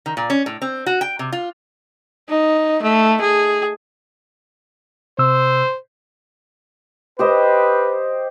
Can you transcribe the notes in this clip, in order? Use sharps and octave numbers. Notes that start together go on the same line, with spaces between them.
D#3
A#2
C#4
A2
C4
F#4
G5
C3
F4
D#4
A3
G#4
C3 C5 E6
G4 B4 C5 D#5